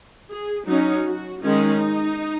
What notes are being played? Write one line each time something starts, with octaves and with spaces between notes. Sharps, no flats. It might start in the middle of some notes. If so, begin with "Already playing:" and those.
G#4
F#3 C#4 D#4
F#4
D#3 G#3 C#4 D#4